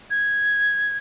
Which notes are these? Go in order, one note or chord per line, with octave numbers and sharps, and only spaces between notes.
G#6